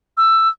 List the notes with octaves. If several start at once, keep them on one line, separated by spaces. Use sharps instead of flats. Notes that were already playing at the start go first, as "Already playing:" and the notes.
E6